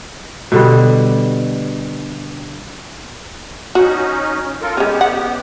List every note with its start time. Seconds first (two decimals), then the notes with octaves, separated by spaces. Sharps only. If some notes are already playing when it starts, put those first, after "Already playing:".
0.52 B2 D3 G3
3.75 C#4 D#4 F#4
4.61 F4 A4 A#4
4.77 G#3 B3 C#4 G4
5.01 F#5